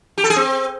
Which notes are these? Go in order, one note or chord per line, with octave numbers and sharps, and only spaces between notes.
G4
A4
G#4
C4